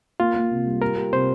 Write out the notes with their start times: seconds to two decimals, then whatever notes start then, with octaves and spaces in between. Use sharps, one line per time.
0.20 A#3 F4
0.35 A#3
0.51 C3
0.66 G3
0.82 G4 A#4
0.97 G4
1.12 C3 C5